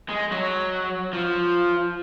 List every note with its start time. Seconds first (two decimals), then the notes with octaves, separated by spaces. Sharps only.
0.10 G#3
0.32 F#3
1.13 F3